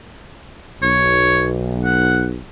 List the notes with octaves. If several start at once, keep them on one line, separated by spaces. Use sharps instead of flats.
B1 C#5
F#5